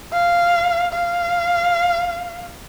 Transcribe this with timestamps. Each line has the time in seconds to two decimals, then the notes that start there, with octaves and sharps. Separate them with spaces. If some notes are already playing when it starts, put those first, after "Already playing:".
0.13 F5
0.93 F5